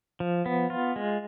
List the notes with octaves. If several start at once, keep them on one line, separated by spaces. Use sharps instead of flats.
F3
B3
F4
G#3